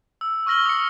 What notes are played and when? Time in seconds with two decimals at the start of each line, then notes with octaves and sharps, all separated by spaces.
0.21 E6
0.46 C#6 E6 F6 A#6 F#7 G7
0.66 D#6 C#7